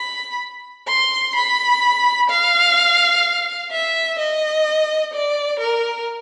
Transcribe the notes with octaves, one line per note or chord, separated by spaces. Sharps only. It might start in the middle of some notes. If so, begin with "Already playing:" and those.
Already playing: B5
C6
B5
F5
E5
D#5
D5
A#4